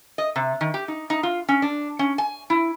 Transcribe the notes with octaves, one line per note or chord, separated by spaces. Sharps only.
D#5
C3
D#3
G4
D#4
D#4
F4
C#4
D4
C#4
G#5
E4